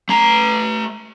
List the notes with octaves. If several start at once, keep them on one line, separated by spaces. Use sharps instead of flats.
A3 A#5